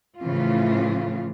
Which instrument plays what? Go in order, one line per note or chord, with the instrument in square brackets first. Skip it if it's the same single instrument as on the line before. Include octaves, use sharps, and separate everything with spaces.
[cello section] A2 C#3 E3 F3 F4